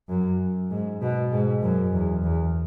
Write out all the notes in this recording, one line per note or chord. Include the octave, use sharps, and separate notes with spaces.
F#2
G#2
B2
G#2
F#2
E2
E2